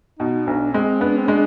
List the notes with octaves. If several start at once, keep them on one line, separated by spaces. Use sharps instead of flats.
B2 D#4
B1 D4
G#3 C4
B3 D4
C4
G#3 D4